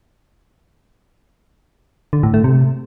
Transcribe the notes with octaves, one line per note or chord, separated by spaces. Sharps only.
D3
A2
A3
C3